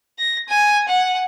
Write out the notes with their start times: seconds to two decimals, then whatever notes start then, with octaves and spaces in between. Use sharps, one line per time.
0.19 A#6
0.49 G#5
0.88 F#5